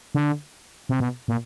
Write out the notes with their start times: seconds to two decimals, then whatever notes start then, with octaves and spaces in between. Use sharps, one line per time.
0.15 D3
0.89 C3
1.00 B2
1.28 A#2